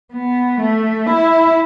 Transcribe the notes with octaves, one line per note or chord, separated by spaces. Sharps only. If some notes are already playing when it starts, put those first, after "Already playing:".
B3
A3
E4